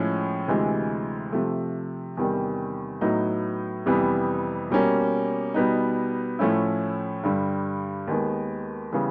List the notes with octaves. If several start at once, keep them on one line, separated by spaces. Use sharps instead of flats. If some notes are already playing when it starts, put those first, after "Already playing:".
Already playing: A2 F3 G#3 C#4 E4
D2 C3 E3 G#3
C3 F3 A3
E2 C3 D#3 G3
A2 F#3 B3 D#4
F2 C3 E3 G3 B3
B2 G3 A#3 C#4
B2 G3 B3 D#4
A2 F3 A3 C#4 E4
G2 D3 G3
D#2 D#3 G#3 B3
C#3 E3 G3 B3